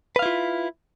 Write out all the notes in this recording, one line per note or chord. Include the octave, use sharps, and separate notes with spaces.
E4 F4 B4 F5